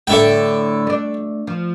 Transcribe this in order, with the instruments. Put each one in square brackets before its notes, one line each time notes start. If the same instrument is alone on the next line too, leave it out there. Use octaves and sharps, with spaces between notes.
[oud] A2 D3 [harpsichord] A4 E5 G5
[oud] A3 D4
F3